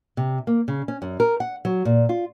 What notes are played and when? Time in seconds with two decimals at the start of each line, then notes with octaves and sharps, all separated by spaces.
0.17 C3
0.47 A#3
0.68 C#3
0.88 C#4
1.02 F#2
1.20 A#4
1.40 F#5
1.65 F#3
1.85 A#2
2.09 F4